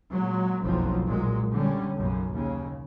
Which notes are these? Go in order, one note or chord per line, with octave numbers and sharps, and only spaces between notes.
A#2 F#3 G#3
F#1 B1 F2 F3 F#3
A#2 F#3 G#3
D3 G3 C#4
B1 F#2 C#3
D#2 C#3